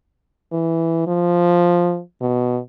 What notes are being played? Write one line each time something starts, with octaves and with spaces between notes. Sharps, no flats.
E3
F3
B2